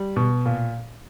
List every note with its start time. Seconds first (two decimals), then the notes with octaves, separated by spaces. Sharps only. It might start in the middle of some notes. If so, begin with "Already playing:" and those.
Already playing: G3
0.16 B2
0.46 A#2